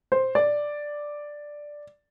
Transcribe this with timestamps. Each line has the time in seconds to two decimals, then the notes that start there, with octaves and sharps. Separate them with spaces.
0.12 C5
0.35 D5